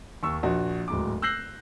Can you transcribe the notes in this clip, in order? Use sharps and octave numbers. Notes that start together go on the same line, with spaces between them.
D#2 C#6 E6
A#1 F#4
D1 G#2 D6
E6 F#6 G6 A#6 C7 F#7